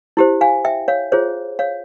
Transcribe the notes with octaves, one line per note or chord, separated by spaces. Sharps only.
E4 G4 C5
F5 G#5
E5 G5
C#5 F5
F4 G#4 C5 C#5
C#5 F5